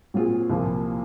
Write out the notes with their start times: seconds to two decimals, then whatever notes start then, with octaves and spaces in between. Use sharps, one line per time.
0.14 A#2 F#3 C4 F4 G#4
0.50 C2 A#2 F3 A#3 F4